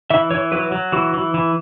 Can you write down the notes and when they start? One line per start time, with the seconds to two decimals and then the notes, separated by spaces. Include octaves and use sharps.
0.10 E3 E5
0.31 E3 C#5
0.52 F#3 B4
0.72 F#3
0.92 E3 F#4
1.14 E3
1.34 E3